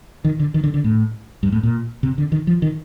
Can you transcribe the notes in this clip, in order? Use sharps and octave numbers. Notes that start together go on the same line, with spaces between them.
D#3
D3
D#3
D3
D3
A2
G2
A2
A#2
C3
D3
D#3
F3
D#3